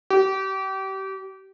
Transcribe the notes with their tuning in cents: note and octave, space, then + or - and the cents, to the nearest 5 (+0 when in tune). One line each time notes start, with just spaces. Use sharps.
G4 -30